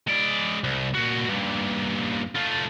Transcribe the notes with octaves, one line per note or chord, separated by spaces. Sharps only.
G#3 D5
C2
A#2 F#4
G2 A#2
A3 F4